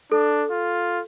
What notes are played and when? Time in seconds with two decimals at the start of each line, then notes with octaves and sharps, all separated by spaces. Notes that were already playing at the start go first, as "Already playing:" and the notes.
0.12 D4 A4
0.51 F4